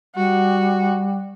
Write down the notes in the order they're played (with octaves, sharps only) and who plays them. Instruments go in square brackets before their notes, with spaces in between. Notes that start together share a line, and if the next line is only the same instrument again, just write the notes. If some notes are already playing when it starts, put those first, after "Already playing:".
[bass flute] G3 [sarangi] F#4